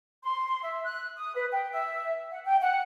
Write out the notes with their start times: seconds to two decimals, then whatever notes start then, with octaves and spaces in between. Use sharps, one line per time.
0.23 C6
0.62 E5
0.84 F#6
1.16 D#6
1.35 B4
1.53 G5
1.72 E5
2.31 F#5
2.45 G5
2.61 F#5